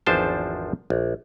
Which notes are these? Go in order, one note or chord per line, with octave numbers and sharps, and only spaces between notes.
G#1 E2 F3 D4 C5 A5
A#1